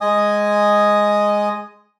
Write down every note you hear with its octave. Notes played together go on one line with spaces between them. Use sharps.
G#3 D#5 G#5 D#6